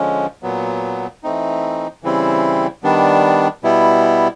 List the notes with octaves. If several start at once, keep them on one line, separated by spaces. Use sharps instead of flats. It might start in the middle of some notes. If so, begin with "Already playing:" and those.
Already playing: D3 F3 G#3 C#4
A#2 F#3 B3
E3 A3 C4 D#4
C#3 E3 G3 C4 E4
D#3 G3 B3 D4
B2 G3 B3 E4